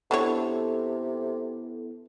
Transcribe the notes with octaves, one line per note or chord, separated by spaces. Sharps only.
C3 F#3 B3 D4 E4 A4 C#5